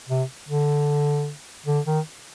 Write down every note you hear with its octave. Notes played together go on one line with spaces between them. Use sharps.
C3
D3
D3
D#3